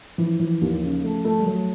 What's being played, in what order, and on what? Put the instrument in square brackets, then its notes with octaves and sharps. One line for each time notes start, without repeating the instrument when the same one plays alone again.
[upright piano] E3 [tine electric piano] F3
[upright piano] E3
D#2
C#3
A3
A3
[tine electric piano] G3
[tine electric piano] F#3 [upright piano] A3